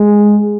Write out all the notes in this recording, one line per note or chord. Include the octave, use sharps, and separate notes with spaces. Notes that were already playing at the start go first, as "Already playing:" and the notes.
Already playing: G#3